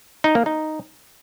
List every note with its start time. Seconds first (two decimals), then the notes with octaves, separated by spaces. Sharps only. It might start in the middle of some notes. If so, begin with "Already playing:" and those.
0.24 D#4
0.35 A#3
0.46 D#4